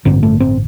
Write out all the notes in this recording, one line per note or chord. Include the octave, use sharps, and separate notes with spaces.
A1 G2 D3 C4
A3
C4